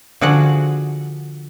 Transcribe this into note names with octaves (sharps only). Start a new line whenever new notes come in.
D3 F3 F#4 G#4 F#5